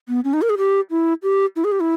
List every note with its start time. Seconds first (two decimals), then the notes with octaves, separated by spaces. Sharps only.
0.09 B3
0.24 C#4
0.33 D#4
0.42 A#4
0.50 G#4
0.58 G4
0.91 E4
1.23 G4
1.56 E4
1.64 G#4
1.72 G4
1.80 E4